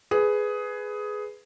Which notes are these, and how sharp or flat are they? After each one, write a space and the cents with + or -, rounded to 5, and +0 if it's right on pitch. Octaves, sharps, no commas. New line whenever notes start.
G#4 +10 B4 +10